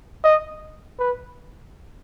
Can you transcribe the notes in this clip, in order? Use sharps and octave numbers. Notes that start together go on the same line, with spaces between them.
D#5
B4